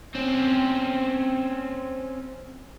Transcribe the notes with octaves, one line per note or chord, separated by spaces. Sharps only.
C4 C#4